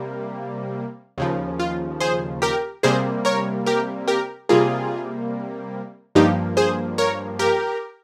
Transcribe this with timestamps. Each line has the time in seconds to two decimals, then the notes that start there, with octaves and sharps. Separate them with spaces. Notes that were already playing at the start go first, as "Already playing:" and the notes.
Already playing: C3 G3 A#3
1.18 D#2 C#3 F3
1.59 F4
2.00 G#4 C5
2.42 G4 A#4
2.83 C3 G3 A#3 G#4 C5
3.25 A#4 C#5
3.66 G4 A#4
4.08 G4 A#4
4.49 C3 G3 A#3 F4 G#4
6.15 G2 F3 A#3 D#4 G4
6.57 G#4 C5
6.98 A#4 C#5
7.39 G4 A#4